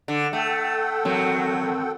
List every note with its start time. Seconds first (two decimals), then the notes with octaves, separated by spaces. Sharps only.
0.08 D3
0.33 A3 A4 F#5 G5
1.05 F#3 C4 F#4 A#4